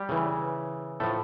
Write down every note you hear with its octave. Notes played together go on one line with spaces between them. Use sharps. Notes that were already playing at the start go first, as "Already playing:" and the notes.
Already playing: G3 G4
C#3 E3
A2 F3 A3 A4